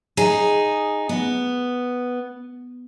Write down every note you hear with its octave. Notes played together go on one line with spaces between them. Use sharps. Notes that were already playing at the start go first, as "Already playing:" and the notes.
D#4 G#4
B3